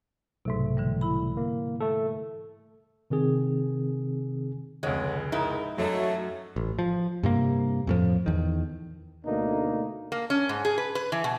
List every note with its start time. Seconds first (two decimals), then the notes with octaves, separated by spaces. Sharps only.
0.45 B1 G#2 C3 A3
0.77 D3 E3 G3
1.01 E4 B5
1.37 A#3
1.80 A3 A4
3.10 C3 D#3 C4 G#4
4.83 F1 C#2 D3 G#3 C#5 F#5
5.32 G#2 D#4 E4 G#4 A#4
5.78 F#2 F#3 A3 F#4 C#5 D#5
6.56 A1
6.79 F3
7.23 G2 C3 A#3
7.87 F2 A2 F3
8.26 E2 D#3
9.25 D2 B2 A3 A#3 D4 D#4
10.12 A#3
10.30 C#4
10.49 G#2
10.65 G#4
10.78 B4
10.95 B4
11.12 E3
11.24 B2